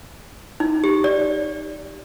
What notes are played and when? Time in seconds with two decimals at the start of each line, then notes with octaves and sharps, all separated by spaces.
0.60 D#4
0.84 G4
1.04 D5